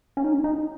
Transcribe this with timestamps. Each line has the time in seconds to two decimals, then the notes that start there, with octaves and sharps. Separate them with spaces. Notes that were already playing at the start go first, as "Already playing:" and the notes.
0.17 C#4
0.24 D#4
0.33 C#4
0.44 D#4